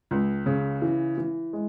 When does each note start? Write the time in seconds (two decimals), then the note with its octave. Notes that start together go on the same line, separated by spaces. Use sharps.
0.11 C#2
0.46 C#3
0.82 E3
1.18 E3
1.53 G#3